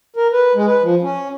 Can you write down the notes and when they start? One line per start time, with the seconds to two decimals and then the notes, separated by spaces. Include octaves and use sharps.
0.16 A#4
0.32 B4
0.55 G#3
0.67 B4
0.82 F3
1.02 C#4